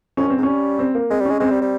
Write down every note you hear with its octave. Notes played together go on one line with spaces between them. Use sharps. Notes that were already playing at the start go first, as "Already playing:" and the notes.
F2 C#4
G2 C4
G#2
G3 C#4
C4
A#3
G#3 C4
G3
G#3 C#4
G#3 C4
G3
G3